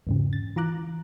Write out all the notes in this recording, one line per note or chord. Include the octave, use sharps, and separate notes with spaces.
E2 G#2 C#3
A6
E3 F4 A#5 D6 F#6